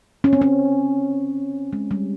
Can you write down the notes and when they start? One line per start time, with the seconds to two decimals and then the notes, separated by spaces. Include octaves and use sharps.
0.24 C#4
0.33 C4
0.42 C#4
1.73 G#3
1.91 G3